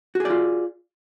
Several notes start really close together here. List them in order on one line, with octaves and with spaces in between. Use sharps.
F#4 G#4 D5 F4